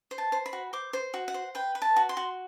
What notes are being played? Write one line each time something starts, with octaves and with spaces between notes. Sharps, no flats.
C5
A5
C5
B5
F#4
C5 D6
C5
F#4
F#5
C5
B4 G5
B4
A5
F#4
C6
F#4